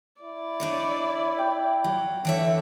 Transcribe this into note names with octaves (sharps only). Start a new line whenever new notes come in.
E4 D5
D4 D#4 C#5
G5
F#3
D3 E3 A4 C#5 E5